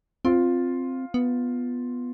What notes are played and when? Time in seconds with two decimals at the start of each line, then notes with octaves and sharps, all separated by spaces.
0.25 C4 F4
1.14 B3